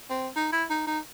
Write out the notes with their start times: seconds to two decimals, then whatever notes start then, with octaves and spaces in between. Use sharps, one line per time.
0.10 C4
0.36 D#4
0.52 E4
0.70 D#4
0.87 D#4